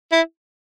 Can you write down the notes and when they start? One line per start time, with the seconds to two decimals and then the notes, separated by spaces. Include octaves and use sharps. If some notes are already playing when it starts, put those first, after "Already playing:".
0.12 E4